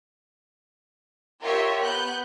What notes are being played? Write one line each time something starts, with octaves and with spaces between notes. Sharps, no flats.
F4 G4 A#4 C#5 E5
B3 F#6 G6